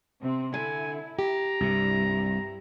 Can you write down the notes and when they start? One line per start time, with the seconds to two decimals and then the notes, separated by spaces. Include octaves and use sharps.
0.20 C3 C4
0.54 D3 E4 G#5
1.19 G4 A#5
1.60 C2 G2 C3 G3 E4